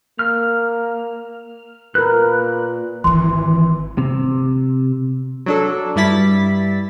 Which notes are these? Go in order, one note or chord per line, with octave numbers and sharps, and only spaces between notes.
A#3 F6
A#2 A#4 B4 F#6
G#1 D#3 E3 C6
C3
F#3 D4 A4
G2 G3 E4 A6 B6